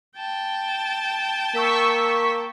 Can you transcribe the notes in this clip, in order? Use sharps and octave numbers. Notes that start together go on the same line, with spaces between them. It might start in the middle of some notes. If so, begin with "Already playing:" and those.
G5 A5
A#3 C#6 E6 B6